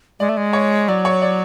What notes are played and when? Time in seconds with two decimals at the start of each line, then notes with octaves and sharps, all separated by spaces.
0.20 G#3 D5
0.29 A3
0.37 G#3
0.53 C#5
0.88 F#3 D5
1.05 C#5
1.22 D5